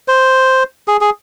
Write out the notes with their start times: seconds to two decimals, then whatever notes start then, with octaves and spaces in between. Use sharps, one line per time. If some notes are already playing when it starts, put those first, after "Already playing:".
0.08 C5
0.88 G#4
1.01 G#4